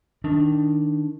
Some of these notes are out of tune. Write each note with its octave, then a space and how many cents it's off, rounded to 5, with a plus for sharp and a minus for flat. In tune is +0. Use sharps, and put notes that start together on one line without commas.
D#3 +0 D4 +0